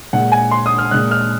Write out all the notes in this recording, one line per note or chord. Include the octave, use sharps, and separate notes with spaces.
A#2 G#3 F#5
G#5
C6
D#6
F6
A#2 G#3 F#6
F6